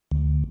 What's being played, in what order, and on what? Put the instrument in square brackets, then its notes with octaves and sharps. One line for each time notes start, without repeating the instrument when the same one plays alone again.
[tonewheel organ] D2